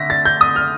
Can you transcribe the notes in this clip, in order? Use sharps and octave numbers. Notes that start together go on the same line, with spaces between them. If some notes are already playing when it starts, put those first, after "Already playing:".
Already playing: D3 A3 A#6 B6
A6
G6
D#6
F6